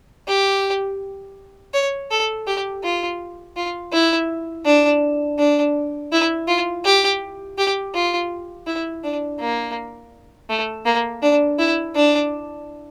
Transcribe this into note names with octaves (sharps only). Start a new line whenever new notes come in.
G4
C#5
A4
G4
F4
F4
E4
D4
D4
E4
F4
G4
G4
F4
E4
D4
A#3
A3
A#3
D4
E4
D4